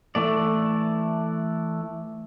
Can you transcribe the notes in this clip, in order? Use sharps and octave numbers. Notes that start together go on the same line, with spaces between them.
E3 A3 D5